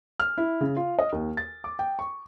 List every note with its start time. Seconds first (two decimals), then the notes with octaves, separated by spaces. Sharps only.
0.20 F6
0.38 E4
0.61 C#3
0.76 F4
0.99 D#5
1.12 D#2
1.37 A6
1.64 D6
1.79 G5
1.99 C#6